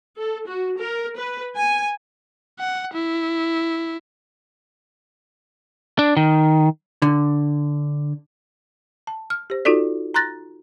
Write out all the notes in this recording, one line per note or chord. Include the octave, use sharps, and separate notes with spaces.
A4
F#4
A#4
B4
G#5
F#5
E4
D4
D#3
D3
A5
F6
G4 C5
D#4 F4 F#4 A4 D5
A#5 C6 F#6 A6 A#6